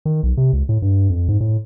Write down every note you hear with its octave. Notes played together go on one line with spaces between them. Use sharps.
D#3
B1
C3
C#2
A2
G2
F2
G#2
A2